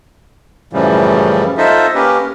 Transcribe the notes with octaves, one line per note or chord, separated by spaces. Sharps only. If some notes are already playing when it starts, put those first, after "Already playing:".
F#2 A2 C#3 E3 F3 G3
D#4 F4 A4 C5 D#5 E5
A#3 C#4 G4 A#4 B4